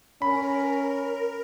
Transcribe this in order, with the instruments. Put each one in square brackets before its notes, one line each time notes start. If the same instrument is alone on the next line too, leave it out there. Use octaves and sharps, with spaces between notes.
[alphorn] C#4 [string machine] A#4 [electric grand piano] B5